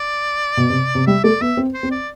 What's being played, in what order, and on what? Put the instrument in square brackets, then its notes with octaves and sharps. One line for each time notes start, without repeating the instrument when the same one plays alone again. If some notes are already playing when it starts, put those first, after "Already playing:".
Already playing: [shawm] D5
[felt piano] B2
C3
C3
[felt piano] G3 [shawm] E5
[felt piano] A3 [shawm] D5
[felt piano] B3 [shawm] E5
[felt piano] C4
[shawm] C5
[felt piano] C4
[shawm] D5